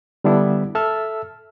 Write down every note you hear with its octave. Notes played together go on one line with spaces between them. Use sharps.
D3 G3 B3 D4 E4
A4 E5 A5 E6 F6